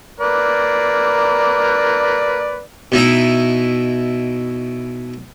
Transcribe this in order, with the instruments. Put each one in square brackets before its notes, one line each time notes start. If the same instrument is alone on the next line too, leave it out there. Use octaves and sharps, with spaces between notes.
[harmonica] A#3 B4 D5
[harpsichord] B2 D#4 E4 A#5